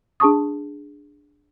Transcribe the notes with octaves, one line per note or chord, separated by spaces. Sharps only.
D4 G#4 A5 C#6 D#6